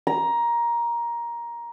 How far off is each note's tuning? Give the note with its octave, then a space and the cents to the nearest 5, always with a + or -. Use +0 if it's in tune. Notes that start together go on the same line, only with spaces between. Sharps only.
A#5 +15